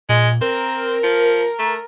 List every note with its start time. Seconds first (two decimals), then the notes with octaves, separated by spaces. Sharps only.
0.09 A#2 G#3
0.41 C4 A#4
1.03 F3
1.59 A3